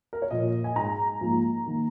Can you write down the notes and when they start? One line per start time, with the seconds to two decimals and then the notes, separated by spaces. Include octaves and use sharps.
0.13 A#4
0.22 C#5
0.30 A#2 F3 A#3 D#5
0.64 G#5
0.76 G#2 G#3 A#5
1.21 G#2 F3 A#3
1.66 D#3 A#3